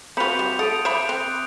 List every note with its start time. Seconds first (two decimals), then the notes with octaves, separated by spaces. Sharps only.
0.17 C4 F4 F#4 B4 B5 G6 C#7 F7
0.39 G3
0.59 A4 F#5 D#6 D7 D#7
0.85 C5 E5 B5 D6 D7
1.09 C4 F#6